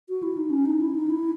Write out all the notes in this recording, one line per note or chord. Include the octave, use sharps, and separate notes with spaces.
F#4
E4
D#4
C#4
D#4
E4
D#4
E4